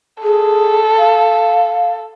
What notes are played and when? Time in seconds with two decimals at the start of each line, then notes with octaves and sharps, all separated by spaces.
0.23 G#4 A4
0.98 F5